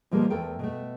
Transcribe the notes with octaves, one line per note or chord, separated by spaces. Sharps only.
B2 F3 G3 G#3 A#3
E2 A3 A4 A#4 G5
B2 A3